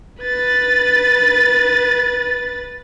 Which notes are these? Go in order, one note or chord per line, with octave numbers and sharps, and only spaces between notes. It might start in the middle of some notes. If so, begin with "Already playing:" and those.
B4 A6